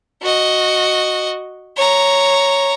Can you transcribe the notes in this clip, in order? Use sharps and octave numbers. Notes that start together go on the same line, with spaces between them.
F#4 D#5
C#5 A#5